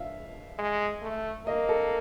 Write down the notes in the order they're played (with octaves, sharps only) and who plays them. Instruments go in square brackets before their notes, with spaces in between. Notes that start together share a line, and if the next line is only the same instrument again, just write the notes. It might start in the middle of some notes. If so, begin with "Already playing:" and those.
Already playing: [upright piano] E5 F5
[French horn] G#3
A3
[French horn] A#3 [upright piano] D#5
[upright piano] A4